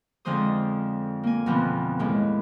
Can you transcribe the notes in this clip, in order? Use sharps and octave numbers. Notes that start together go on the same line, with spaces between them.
F2 D3 F3 G#3 C5 D#6
A#3 G#5
F2 B2 D3 E3 F3 B3
D#2 A2 G#3 E4